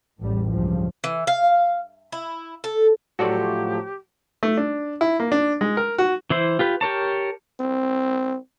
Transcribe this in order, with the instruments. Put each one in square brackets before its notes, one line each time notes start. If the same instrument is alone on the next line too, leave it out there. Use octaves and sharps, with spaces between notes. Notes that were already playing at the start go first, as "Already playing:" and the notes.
[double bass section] A1 E2 A2 G3
C#2 G2 F3
[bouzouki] E3
F5
E4
A4
[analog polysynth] A2 F3 F#3 [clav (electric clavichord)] F#4 A4 D5 [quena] G4
[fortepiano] A3
D4
E4
A#3
D4
G#3
A#4
F#4
[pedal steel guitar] E3 E4 C5
F4 G4 B4
G4 A#4 C#5 A5
[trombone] C4